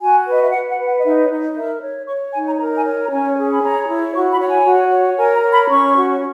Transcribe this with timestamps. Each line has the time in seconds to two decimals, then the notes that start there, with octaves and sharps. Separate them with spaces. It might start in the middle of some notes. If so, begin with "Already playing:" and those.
0.01 F#4 G#5
0.27 B4 D#5
0.42 E5
0.52 B4 F#5
0.70 F#5
0.78 B4
0.87 F#5
0.98 D#5
1.04 D#4 E5
1.24 C#5
1.29 D#4 D#5
1.56 A#4 E5
1.82 C#5
2.07 C#5 C#6
2.33 D#4 G#5
2.46 A#5
2.59 A#4 A#5
2.76 G#5
2.85 C#5
3.05 A#5
3.11 C#4 G#5
3.37 G#4
3.52 B5
3.63 C#5 A#5
3.88 E4
4.14 F#4 C#6
4.31 B5
4.40 C#5 F#5
4.49 G#5
4.65 F#4
4.92 C#5
5.17 A#4 G#5
5.35 A#5
5.43 C#5
5.52 B5
5.69 C#4 C#6
5.95 F#4